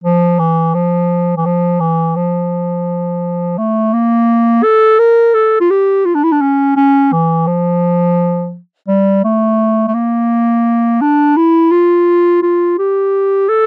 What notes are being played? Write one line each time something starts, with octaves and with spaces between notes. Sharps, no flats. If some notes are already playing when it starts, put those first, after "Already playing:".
F3
E3
F3
E3
F3
E3
F3
A3
A#3
A4
A#4
A4
F4
G4
F4
D4
E4
D4
C#4
C#4
E3
F3
G3
A3
A3
A#3
D4
E4
F4
F4
G4
A4